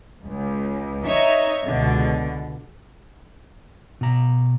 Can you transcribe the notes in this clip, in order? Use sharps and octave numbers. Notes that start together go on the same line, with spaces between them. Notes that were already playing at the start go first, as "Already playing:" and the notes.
C#2
D#4 C#5 D#5 E5
C#2 B2 D3
B2 A#5